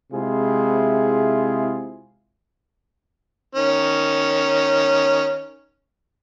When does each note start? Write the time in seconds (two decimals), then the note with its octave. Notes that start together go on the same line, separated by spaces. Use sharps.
0.13 C3 G#3 E4 F4 G#4
3.55 D#3 C#4